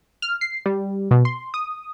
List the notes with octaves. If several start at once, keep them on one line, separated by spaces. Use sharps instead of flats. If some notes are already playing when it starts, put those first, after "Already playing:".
F6
C7
G3
B2
C6
D#6